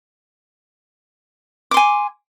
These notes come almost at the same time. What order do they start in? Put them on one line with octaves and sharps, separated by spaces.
D6 C6 G#5